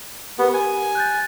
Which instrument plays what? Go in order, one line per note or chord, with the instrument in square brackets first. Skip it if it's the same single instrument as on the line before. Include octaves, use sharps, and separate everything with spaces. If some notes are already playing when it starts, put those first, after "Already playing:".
[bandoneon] B3 [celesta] G4 A#4
[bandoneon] G#5
[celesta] F#6 G6 A6